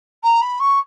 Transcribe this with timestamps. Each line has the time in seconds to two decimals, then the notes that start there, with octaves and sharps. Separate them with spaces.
0.23 A#5
0.42 B5
0.60 C#6